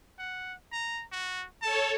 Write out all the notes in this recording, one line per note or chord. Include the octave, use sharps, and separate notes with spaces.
F#5
A#5
F#4
A4 C#5 A5